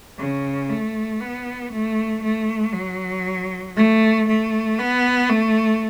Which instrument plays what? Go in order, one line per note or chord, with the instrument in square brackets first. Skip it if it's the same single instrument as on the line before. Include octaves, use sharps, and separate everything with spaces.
[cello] C#3
A3
B3
A3
A3
F#3
A3
A3
B3
A3